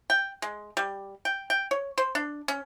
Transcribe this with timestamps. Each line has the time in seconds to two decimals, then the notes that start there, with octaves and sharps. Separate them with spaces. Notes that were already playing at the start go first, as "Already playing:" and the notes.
0.10 G5
0.42 G#3
0.77 G3
1.25 G5
1.50 G5
1.71 C#5
1.98 C5
2.15 D4
2.48 C#4